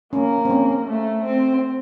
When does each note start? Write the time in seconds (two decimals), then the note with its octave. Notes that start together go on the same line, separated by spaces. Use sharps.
0.13 A#3 C#4
0.45 C4
0.50 C#4
0.86 A3
1.23 C4